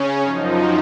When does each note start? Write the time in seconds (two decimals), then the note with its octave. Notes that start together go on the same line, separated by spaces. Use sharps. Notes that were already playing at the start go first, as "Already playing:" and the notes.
Already playing: C#3 C#4
0.23 F#2 F3 D#4